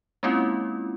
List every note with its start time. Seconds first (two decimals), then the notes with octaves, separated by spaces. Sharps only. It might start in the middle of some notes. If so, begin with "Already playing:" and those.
0.23 G#3 A#3 C4 C#4 E4 F4